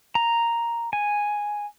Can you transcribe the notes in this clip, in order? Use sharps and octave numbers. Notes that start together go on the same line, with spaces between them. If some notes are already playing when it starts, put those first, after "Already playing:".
A#5
G#5